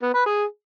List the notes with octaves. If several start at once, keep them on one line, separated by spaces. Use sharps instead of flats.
B3
B4
G#4